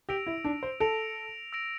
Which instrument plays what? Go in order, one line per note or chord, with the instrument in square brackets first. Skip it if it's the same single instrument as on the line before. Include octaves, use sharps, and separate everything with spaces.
[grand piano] G4 [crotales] E6 A#6 D7 F7
[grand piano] E4
D4
C5
[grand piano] A4 [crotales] E6 A#6 D7 F7
[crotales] E6 A#6 D7 F7